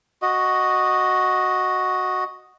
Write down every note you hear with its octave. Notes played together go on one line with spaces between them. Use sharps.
F#4 D#5